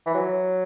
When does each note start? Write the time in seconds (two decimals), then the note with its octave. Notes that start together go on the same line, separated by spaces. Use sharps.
0.06 E3
0.15 F#3